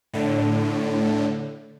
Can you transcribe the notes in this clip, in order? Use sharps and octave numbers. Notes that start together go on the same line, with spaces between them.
A2 D3